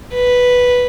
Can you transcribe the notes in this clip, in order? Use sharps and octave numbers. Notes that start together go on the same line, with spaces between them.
B4